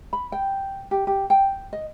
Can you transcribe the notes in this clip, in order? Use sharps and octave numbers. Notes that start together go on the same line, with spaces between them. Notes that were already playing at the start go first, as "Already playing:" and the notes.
B5
G5
G4
G4
G5
D#5